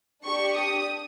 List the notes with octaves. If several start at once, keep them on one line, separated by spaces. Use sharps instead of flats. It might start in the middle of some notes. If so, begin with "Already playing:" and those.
D4 G4 C#6
D#6